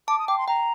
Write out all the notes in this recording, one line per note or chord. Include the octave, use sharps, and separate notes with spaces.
A5 D6
D#6
G5 D6
C6
G5 A#5